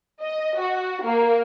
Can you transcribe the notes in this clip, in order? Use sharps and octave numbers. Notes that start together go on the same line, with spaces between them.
D#5
F#4
A#3